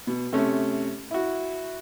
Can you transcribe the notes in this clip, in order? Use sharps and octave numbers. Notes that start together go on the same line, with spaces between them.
B2
C3 A3 C#4
E4 F#4